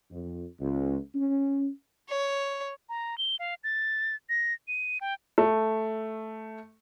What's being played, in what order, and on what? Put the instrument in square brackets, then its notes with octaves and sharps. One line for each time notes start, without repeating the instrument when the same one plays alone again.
[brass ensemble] F2
C#2
C#4
[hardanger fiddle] C#5
[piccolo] A#5
G7
F5
A6
A#6
D#7
G5
[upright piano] A3